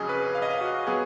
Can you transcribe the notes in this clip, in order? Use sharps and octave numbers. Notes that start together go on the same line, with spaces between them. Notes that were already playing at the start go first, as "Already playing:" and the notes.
Already playing: F2 C#3 F#3 C#4 G#4 D#5
B4
F5
D#5
F5
F#4
F#3 B3 G#4